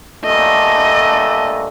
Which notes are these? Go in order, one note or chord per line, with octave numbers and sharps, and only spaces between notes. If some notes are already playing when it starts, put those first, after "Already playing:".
G2 A#2 A3 D#5